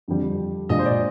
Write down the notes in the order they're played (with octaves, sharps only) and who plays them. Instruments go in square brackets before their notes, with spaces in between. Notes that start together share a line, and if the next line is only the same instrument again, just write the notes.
[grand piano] F2 D3 G3
[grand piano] A#2 G#3 D4 [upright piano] D#5
[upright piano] C5
D5